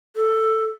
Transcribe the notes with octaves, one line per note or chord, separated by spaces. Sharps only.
A4